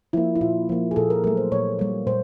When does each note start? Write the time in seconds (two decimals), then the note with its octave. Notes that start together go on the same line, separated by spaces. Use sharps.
0.13 F3 A#3 E4
0.35 E4
0.41 A#2 F4
0.69 F3 A#3
0.91 G#4
0.96 A#2 A4
1.10 A#4
1.24 F#3 A3 A#4
1.37 C5
1.52 A#2 C#5
1.79 G3 A#3
2.07 A#2 C5